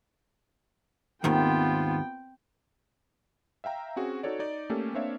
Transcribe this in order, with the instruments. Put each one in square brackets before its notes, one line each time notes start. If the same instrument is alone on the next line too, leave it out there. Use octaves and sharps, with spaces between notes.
[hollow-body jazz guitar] D#2 G#2 D#3 [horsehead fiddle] B3 F4 [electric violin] C4 G5
[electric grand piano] E5 F5 G5 A#5
C4 C#4 F#4 G#4
D#4 F#4 A4 C#5 D5
D#4 D5
A3 A#3 C#4 G4 A4
A#3 C4 D4 C#5 E5 F5